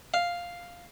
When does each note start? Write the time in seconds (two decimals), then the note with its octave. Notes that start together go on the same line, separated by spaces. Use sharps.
0.14 F5